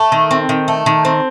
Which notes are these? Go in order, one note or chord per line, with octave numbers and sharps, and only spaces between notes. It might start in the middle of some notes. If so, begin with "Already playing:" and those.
Already playing: A3 A4
D#3
C4
D#3
A3
D#3
C4